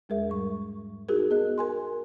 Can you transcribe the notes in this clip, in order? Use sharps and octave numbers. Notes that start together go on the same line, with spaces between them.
E2 G#3 G#4 A#4 E5
G#2 G3 C#6
D#4 F#4 G#4 A#4
B3 G#4 D#5 F#6
A#4 G#5 C6